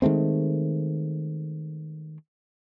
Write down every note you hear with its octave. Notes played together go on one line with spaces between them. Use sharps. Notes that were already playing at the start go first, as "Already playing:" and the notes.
D#3 G#3 A3 C4